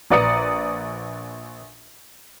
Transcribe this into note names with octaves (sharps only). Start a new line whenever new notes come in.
A#1 B4 D5 A#5 D#6 C#7